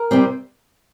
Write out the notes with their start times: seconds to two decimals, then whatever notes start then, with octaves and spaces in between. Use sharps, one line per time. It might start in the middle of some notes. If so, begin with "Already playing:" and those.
Already playing: A#4
0.11 C3 G3 C4